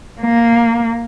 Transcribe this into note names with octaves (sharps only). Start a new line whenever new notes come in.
A#3